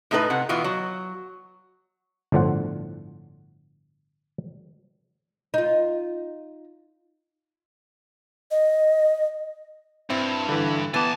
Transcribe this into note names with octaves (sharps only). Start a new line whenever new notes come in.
A2 A3 D#4 F4 B4
C3 F#5
B2 E3 B3 F4
F#3
G1 A2 D3 F3 F4 F#5
D#4 F4
D#5
G2 C4 E4
D3 E3
E3 B3 G#5 A5 A6